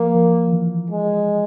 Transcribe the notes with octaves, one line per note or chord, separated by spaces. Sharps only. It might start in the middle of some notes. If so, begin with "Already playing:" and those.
Already playing: F3 A#3
F3
F3
E3
G#3